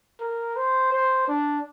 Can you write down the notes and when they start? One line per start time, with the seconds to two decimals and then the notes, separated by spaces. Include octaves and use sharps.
0.21 A#4
0.56 C5
0.92 C5
1.28 D4